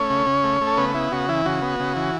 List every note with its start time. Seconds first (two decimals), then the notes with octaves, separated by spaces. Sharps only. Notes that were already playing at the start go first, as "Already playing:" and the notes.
Already playing: A3 C#4 C#5
0.10 C#3
0.27 C#3
0.44 A3
0.61 A3
0.67 A4
0.77 C#3 B3 B4
0.94 B3 E4
1.12 C#3 F#4
1.29 E3 E4
1.46 C#3 F#4
1.62 B3
1.80 C#3
1.96 E3